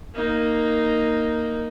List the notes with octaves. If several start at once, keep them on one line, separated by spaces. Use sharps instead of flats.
A#3 D#4